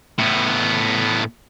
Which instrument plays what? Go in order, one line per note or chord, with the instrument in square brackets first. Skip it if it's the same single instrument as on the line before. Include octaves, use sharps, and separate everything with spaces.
[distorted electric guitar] A2 B3